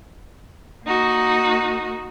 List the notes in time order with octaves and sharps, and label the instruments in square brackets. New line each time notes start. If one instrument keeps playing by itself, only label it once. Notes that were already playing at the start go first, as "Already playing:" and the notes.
[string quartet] A#3 D#4 F#4